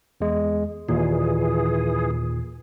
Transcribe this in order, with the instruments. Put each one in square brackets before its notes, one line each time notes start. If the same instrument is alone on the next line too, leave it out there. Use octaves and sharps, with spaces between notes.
[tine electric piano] E2 G#3
[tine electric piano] D#2 A#2 [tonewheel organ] E3 G#4